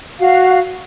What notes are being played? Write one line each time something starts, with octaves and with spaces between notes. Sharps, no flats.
F#4 F5